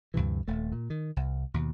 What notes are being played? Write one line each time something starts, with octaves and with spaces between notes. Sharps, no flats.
D2 G2 C3 E3
D#1 A3
A#2
D#3
C2
D#2 B2